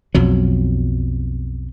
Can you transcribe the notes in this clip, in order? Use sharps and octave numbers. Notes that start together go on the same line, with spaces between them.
B1 F2 F#3